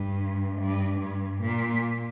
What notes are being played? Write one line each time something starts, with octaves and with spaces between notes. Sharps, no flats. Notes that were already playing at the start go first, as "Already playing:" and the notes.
Already playing: G2
G2
G2
A#2